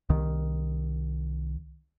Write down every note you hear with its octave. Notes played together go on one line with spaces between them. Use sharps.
C2 D#3